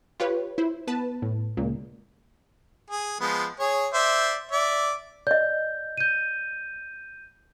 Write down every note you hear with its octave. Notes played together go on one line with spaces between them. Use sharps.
F4 G4 B4 C#5
E4 C5
B3 B4 A5
A2
C#2 A#2
G#4
F3 G#3 B3
G#4 C#5
C5 D5 E5
D5 E5
D5 D#5 G6
G6 D#7